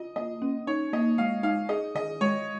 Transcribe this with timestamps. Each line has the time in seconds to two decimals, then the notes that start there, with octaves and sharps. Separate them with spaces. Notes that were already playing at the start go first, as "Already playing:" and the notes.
Already playing: F4 D#5
0.16 A#3 D#5
0.42 C#4
0.67 D#4 C#5
0.93 A#3 D#5
1.18 G#3 F5
1.43 D#4 F5
1.69 G#4 D#5
1.95 D#3 D#5
2.21 G#3 C#5